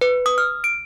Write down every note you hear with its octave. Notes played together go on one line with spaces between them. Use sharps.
B4
D#6
F6
D7